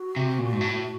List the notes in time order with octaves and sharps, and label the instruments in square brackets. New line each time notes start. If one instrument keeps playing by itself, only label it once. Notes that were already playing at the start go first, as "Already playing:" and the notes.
Already playing: [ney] F#4
[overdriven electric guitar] C3
A#2
G#2
A2